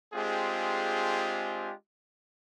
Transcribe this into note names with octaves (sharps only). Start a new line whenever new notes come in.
G#3 C4 D4 F4 G4 G#4